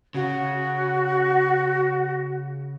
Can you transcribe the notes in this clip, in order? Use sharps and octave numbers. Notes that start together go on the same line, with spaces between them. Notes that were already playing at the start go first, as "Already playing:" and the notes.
C#3 F#4